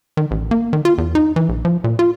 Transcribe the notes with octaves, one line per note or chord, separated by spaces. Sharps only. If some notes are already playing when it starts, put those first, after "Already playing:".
D#3
A1
A#3
D#3
F4
E2
D#4
E3
A#1
F3
A#2
F4